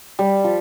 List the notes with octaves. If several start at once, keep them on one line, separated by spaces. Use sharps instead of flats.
G3
F3